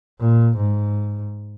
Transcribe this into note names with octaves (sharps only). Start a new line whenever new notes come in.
A#2
G#2